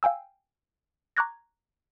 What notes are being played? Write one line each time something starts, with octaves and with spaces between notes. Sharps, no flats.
F5 G5 G#5 E6
A#5 C#6 D6 F#6 G#6 A#6